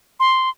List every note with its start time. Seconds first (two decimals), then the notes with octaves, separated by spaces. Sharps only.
0.20 C6